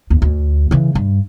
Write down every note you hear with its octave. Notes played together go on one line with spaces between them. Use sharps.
G1 D#2
D2
C#3 E3
G2